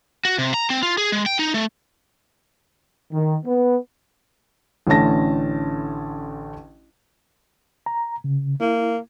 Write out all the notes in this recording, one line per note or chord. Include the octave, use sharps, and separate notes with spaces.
F#4
C3
A#5
C4
F4
G#4
G#3
G5
D#4
A3
D#3
B3
A1 D3 A3 C#4 A5 A#6
A#5
C#3
A#3 E4